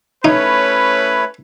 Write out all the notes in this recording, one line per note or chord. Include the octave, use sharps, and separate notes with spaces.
A3 C#4 D#4 E4 B4 C#5